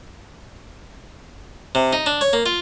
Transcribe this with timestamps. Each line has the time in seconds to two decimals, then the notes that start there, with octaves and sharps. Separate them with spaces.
1.75 C3
1.93 D#4
2.06 D4
2.21 C#5
2.33 A#3
2.46 F4